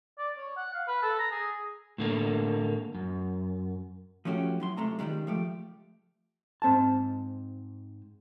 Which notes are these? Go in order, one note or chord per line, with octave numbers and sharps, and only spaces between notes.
D5
C#5
F#5
F5
B4
A4
A#5
G#4
A2 D3 A#3
F#2
F3 A3 C#4 F#4 G4
F#3 E4 C6
C#2 C3 A3 A#5
C#2 A#2 D#3 G3 G#3
F3 A3 G4
G#2 C4 A5